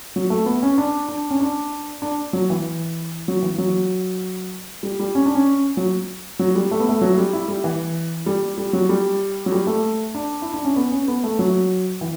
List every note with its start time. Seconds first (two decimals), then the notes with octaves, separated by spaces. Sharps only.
0.16 F#3
0.30 A3
0.46 B3
0.62 C#4
0.78 D4
1.09 D4
1.30 C#4
1.41 D4
2.02 D4
2.33 F#3
2.50 E3
3.28 F#3
3.42 E3
3.58 F#3
4.83 G3
4.99 G3
5.15 C#4
5.26 D4
5.35 C#4
5.77 F#3
6.39 F#3
6.55 G3
6.71 A3
6.80 B3
6.89 A3
7.01 F#3
7.18 G3
7.33 E4
7.48 G3
7.64 E3
8.26 G3
8.58 G3
8.73 F#3
8.89 G3
9.46 F#3
9.52 G3
9.67 A3
10.15 D4
10.42 E4
10.53 D4
10.65 C#4
10.76 B3
10.92 C#4
11.08 B3
11.24 A3
11.39 F#3
12.01 E3